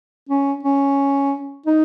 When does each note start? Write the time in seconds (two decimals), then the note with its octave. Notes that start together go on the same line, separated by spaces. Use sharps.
0.29 C#4
0.63 C#4
1.66 D#4